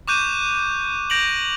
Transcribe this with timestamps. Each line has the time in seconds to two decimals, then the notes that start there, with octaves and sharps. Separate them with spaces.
0.08 C#6 D6 F#6 G6 D#7 E7
1.10 G6 A#6 D7 F7 F#7